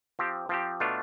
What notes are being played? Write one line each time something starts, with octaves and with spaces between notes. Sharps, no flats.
F3 C4 G4
F3 C4 G4
B2 A3 D4 F4